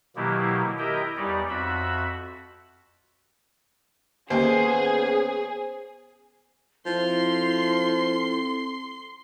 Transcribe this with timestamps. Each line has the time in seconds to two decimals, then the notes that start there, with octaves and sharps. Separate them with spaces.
0.16 B2 D#3 F#3 A#3 E4 G4
0.78 E4 G4 A#4 D#5 E5 G5
1.17 E2 G3 D#4 G4 C#5 D5
1.49 F2 F#4 E5 B5
4.30 D#2 B3 C#4 G#4 C5
6.86 F3 C4 E4 A4 C6